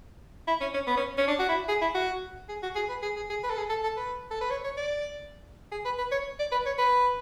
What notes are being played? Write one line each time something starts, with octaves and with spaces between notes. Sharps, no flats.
E4
C#4
C#4
B3
C#4
C#4
D4
F#4
E4
G#4
E4
F#4
G#4
F#4
G#4
B4
G#4
G#4
G#4
B4
A4
G#4
A4
A4
B4
A4
B4
C#5
C#5
D5
G#4
B4
B4
C#5
D5
B4
C#5
B4